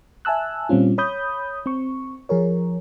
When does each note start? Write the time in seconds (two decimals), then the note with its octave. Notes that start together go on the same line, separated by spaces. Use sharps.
0.25 E5 G#5 A5 E6 F#6
0.69 A#2 G3 C4 C#4 F4
0.98 C#5 B5 D#6 G6
1.66 C4 C#6
2.29 F3 G#4 A#4 C#5